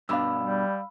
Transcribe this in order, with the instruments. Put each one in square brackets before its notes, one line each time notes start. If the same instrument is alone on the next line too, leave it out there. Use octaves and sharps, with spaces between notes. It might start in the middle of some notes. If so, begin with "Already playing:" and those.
[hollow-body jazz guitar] G2 B2 D4 [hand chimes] F5 B5 E6
[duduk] G3